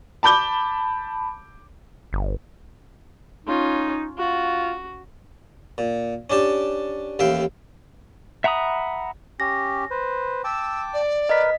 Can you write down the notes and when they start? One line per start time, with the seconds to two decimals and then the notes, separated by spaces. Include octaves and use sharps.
0.23 A5 B5 D6 G6 G7
2.13 G1
3.46 C#4 D#4 F4
4.18 F4 F#4
5.78 A#2
6.30 C#4 D4 G4 A5
7.19 A1 D#2 E5 F5 G5
8.44 E5 F#5 A#5 B5 D#6
9.40 C#4 G4 A#6
9.91 B4 C5
10.44 G5 A5 D6 E6
10.93 D5
11.29 A#4 B4 D#5 B6